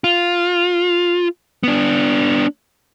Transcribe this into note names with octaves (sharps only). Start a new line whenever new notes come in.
F4
B3 D4